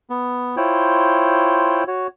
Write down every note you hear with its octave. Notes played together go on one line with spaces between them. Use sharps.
B3
E4 F4 C5 C#5 G5
F#4 C#5